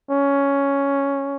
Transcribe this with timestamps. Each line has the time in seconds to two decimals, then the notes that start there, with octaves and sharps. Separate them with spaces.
0.10 C#4